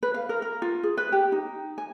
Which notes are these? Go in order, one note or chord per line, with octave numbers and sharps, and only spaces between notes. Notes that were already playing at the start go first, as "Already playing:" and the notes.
B4
F5
A#4
A#4
F4
G#4
B4
G4
D#4
G#5